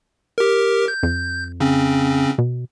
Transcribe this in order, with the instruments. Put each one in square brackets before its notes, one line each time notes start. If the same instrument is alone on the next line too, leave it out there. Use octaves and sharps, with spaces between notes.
[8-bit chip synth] G4 A#4
G6
[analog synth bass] F2
[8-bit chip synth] C#3 C4 C#4
[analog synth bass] B2